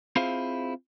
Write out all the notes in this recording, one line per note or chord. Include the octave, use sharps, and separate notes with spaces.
C4 E4 F4 G#4 C5 F5